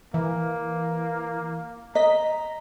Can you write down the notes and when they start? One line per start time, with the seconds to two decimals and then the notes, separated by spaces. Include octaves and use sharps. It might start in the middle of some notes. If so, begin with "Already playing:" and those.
0.14 E3 A#3
1.95 D#5 A#5 B6